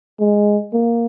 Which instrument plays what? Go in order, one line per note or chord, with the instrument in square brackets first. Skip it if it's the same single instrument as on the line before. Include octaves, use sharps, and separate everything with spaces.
[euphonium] G#3
A#3